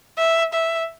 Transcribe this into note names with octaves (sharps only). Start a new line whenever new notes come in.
E5
E5